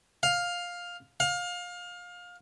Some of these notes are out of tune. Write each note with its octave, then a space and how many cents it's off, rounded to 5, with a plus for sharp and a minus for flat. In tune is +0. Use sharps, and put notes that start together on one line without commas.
F5 +10
F5 +25